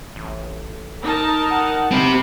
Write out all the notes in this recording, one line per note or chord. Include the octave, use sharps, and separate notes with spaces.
A1
D#4 A#4 A5
F#5
C4 G4 B5